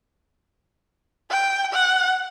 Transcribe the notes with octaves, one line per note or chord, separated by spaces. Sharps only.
G5
F#5